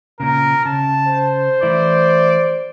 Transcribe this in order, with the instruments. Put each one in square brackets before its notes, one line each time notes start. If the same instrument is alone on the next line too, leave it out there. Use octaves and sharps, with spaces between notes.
[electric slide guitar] A#2 C#3 [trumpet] A#4
[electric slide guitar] C#3 [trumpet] A5
[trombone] C5
[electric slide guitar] E3 A3 E4 [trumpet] D5